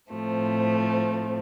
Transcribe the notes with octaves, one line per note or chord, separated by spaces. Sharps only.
A2 F3 A3 C4